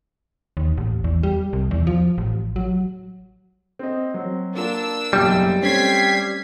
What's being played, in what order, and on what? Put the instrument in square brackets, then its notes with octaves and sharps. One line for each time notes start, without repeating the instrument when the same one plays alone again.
[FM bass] D#2
A1
E2
G3
C2
E2
F3
A1
F#3
[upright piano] C4 D#5
F#3 C4
[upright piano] A#3 F4 A#4 [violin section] D4 E6
[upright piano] F#1 B1 F#2 [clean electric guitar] G3
[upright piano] A3 C4 C#4 [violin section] G#6 B6 C7